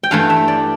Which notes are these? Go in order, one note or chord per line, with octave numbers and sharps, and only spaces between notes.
G5
G2 E3 A3 F5
E5
D5